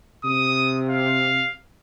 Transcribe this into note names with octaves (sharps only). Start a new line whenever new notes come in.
C3 D#6
F5